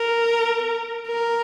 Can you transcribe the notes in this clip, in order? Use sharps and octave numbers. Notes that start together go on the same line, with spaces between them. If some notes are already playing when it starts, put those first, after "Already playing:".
Already playing: A#4
A#4